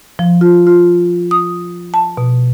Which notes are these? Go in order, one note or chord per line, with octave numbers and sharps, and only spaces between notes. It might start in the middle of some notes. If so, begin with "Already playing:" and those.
F3
F4
F4
D#6
A5
B2